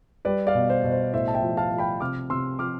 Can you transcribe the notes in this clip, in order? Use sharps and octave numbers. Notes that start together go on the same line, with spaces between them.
G3 B4 D5
D5 F5
B2
C5
B2
C5
A2 C5 E5
A5
E5 G5
F3
F5 A5
F3
G5 B5
C3 D6 F6
C3 C6 E6
F3 D6 F6